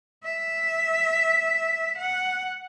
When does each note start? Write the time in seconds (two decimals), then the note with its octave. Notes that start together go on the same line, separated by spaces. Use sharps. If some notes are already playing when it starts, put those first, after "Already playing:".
0.24 E5
1.98 F#5